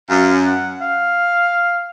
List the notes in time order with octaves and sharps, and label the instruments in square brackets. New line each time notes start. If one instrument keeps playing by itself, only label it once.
[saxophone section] F#2 [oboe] F5
[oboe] F#5
F5